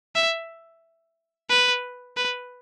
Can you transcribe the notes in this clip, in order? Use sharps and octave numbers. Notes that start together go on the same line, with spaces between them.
E5
B4
B4